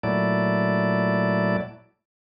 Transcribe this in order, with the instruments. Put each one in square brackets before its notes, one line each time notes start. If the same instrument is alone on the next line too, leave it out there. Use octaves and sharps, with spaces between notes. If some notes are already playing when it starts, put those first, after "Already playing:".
[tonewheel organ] A#2 F#3 A3 E4 D5